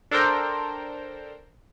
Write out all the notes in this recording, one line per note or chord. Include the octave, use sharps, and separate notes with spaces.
D4 A4 A#4 C5 G5 A#5